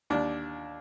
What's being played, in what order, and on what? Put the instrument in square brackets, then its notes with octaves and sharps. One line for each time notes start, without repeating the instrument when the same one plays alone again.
[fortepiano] D#2 D4